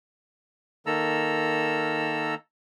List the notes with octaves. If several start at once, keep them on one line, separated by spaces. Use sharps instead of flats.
D#3 A#3 A4 A#5 E6